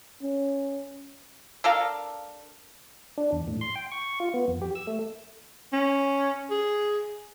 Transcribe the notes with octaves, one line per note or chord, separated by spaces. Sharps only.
C#4
D4 A4 A#4 F5
D4
E2
A2
C6
G5
C#6
F4
B3
F2
G4
E6
A3
C#4
G#4